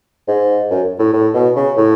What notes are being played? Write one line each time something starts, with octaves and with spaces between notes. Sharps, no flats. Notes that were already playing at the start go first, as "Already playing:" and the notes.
G#2
F#2
A2
A2
B2
C#3
A2